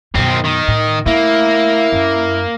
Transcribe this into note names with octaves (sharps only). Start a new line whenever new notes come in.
F#2 B2 D#3 C4
D#3
A2
A3 A#3 E4
F#2